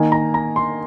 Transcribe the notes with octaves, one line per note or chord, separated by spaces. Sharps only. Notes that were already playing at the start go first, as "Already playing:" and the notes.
Already playing: D#3 A#3 D#4 G#5
A#5
A#5
C6